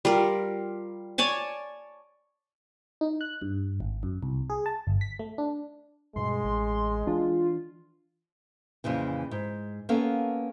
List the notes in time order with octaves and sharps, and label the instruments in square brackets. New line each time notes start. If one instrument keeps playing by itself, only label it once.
[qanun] G3 F4 A#4
C#5 D5 G#5 A5
[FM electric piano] D#4
F#6
G2
G#1
F#2
C2
G#4
A5
G1
B6
A3
D4
[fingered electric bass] G2 B2 [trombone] G#3 [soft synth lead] C6
[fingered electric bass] A1
[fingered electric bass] E3 D4 [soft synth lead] F4
[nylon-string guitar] F2 A#2 C#3 E3
G#2
A#3 B3 C#4 A4 F5